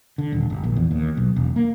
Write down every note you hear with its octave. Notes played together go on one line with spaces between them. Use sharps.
D3
D#1
G1
A#1
E2
D#2
B1
E1
A#3